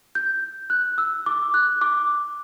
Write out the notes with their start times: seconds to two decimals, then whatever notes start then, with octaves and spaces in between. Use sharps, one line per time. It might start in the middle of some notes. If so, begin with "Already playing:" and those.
0.15 G6
0.70 F#6
0.98 E6
1.26 D6
1.54 F#6
1.81 D6